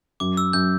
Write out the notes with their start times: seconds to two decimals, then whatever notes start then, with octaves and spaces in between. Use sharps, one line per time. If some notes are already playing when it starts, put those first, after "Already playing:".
0.20 F#2 D6
0.37 E6
0.53 F#2 G6